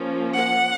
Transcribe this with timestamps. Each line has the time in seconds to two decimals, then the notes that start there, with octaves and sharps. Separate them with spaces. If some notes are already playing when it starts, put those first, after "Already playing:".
Already playing: F3 A#3 C#4
0.36 F#5